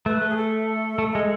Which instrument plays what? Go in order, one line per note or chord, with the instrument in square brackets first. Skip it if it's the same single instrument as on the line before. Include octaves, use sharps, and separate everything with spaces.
[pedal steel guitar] A3 [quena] B4
[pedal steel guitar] A3
[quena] G#4
A4
[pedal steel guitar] A3
G#3